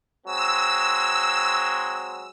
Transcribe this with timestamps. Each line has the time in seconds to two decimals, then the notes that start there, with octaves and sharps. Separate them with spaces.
0.25 F#3 G#3 C4 E6